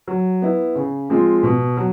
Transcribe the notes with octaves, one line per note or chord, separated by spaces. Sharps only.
F#3
B3 E4
C#3
F3 G#3 C4 F4
B2
F#3